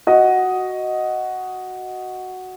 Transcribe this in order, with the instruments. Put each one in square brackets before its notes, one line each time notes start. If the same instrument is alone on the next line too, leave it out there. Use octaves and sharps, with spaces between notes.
[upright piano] F#4 D#5